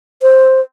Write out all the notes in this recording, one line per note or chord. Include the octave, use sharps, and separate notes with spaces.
C5